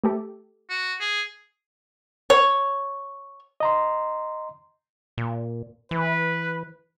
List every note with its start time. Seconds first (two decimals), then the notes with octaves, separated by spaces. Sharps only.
0.04 A3 G4 A4
0.69 F#4
1.00 G#4
2.30 C#5
3.60 D#5 A#5 C6
5.18 A#2
5.91 E3 B4